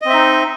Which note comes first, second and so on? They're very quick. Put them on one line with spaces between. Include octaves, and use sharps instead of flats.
D#5 C4 E5 D#4